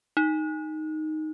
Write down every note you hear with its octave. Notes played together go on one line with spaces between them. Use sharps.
D#4